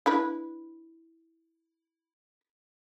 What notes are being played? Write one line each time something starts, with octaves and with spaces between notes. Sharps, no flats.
D4 E4 B4